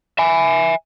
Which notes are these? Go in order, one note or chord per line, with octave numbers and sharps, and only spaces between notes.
E5 G#5